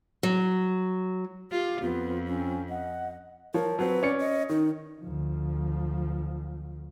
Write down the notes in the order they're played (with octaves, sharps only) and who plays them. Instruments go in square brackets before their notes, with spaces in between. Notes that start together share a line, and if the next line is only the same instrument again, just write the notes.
[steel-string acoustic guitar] F#3
[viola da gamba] F4 [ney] G4
[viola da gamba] F2 [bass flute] B3 [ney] F4
[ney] C4 [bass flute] C#4
[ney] D#5 [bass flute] F#5
[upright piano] F3 C#5 [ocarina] A#4
[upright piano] F#3 C4 [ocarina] B4
[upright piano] C#4 D5 C#7
[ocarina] D#5
[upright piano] D#3 [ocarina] D#4
[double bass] D2 F3